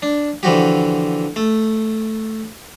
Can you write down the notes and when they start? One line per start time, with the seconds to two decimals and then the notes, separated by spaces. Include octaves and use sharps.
0.02 D4
0.43 D3 E3 F3 F#4 G4
1.36 A3